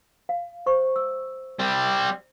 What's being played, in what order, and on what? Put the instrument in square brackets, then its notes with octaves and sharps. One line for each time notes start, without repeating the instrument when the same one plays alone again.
[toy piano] F5
C5 C#6
E6
[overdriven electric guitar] G3 C4